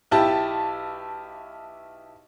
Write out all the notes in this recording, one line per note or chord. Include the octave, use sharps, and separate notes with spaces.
B1 E4 G4 A5